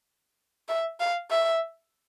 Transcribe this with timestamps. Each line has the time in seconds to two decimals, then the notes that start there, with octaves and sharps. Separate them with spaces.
0.68 E5
1.00 F5
1.31 E5